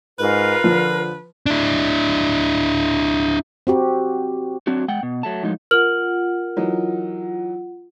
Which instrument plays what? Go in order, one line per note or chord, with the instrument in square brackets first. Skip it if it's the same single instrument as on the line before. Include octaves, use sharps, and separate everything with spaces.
[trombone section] G#2 [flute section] F4 A#4 [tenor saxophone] B4
[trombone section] D3 [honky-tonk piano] F3
[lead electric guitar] D4 E4
[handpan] C4 F#4 G4
[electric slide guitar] F#3 C4 D4 F#4
G#3 F#5 G5
B2
F#3 A3 A5
A2 F3 F#3 G#3 D#4
[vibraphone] F4 F#5 [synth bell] A#4 [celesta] F6 F#7
[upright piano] E3 F#3 D#4